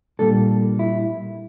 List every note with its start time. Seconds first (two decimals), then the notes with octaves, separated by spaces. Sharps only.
0.19 A#2 G3 A#3 D4 A4
0.79 E4